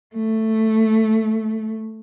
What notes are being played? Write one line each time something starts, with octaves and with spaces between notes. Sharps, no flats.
A3